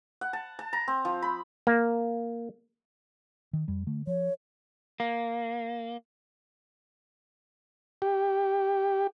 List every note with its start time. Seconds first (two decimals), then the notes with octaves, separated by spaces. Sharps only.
0.21 F#5
0.33 A5
0.59 A5
0.73 A#5
0.88 C4
1.05 F3
1.22 B5
1.67 A#3
3.53 D#3
3.68 F2 G3
3.87 D3 A3
4.07 F3 C#5
5.00 A#3
8.02 G4